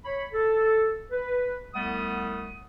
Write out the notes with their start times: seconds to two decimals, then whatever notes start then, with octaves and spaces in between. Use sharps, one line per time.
0.04 C#5 B5
0.33 A4
1.11 B4
1.73 C2 G3 A3 B3 F#5 D#6